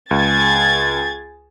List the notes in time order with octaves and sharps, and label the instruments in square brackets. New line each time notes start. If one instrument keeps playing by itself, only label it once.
[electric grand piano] C#2 [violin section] G#4 G#6 A6